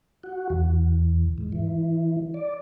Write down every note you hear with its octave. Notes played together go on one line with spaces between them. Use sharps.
F#4
E2
G#2
E3
D5